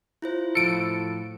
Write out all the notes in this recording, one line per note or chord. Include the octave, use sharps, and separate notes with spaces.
E4 F4 C5
A2 F3 A4 C#7 D7